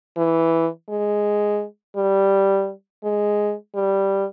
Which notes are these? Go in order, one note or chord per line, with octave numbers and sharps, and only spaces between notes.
E3
G#3
G3
G#3
G3